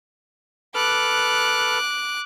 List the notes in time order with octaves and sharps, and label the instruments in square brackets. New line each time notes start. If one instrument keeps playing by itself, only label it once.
[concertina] A4 B4 F6 [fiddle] D6 F#6